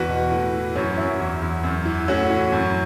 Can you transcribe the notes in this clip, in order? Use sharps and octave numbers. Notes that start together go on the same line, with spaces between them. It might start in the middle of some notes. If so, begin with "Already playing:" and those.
Already playing: E2 F#4 B4
B2
A2
E3
F#2 C#4 F#4
C#4
F#2 E4
E2
E2
F#2
E3
A2 C#4 F#4
E3
F#2